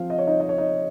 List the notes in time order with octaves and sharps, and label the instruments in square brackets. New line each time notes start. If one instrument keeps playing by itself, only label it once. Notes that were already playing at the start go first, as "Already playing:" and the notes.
Already playing: [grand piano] F3 C4 F4 F5
D#5
C#5
D#4 D#5
D#5
C#5
D#4 D#5